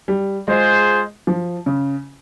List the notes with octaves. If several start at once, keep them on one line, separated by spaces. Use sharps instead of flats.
G3
G#3 F4 G#4 C5
F3
C#3